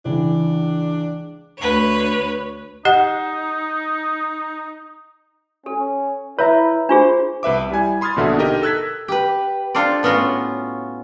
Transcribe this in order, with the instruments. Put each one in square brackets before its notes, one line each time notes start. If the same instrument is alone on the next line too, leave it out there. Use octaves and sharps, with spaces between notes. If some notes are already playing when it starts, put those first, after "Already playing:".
[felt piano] C#2 E3 [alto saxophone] D4
[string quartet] D2 B4 C#5
[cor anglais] D#4 [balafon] G4 D#5 F#5
[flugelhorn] C#4 [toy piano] A4
[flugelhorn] E4 [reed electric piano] B4 E5 A#5 [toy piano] C#5
[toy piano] D4 F4 G#4 [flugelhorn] C5
[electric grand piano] C2 B4 E5 D6
G3 E4 G#5 G#6
B5 C6 D#6 F6 G#6 A6
A#1 B2 D3 E5 D#6
D#4 G4 A#4 D#5
A4 E6 F#6 G#6 B6
[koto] G4 B4
D4 F4 A4 C5 D5
A2 B3 C#4 F4 F#4